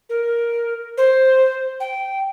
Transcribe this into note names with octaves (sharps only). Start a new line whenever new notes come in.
A#4
C5
G5